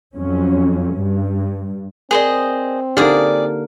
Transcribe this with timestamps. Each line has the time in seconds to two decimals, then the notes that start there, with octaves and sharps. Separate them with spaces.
0.15 F2 F#3 C#4
0.97 G2
2.11 C4 G#4 A#4 C5 D5 D#5
2.97 D3 A#3 D#4 G4 G#4 D5 D#6 F6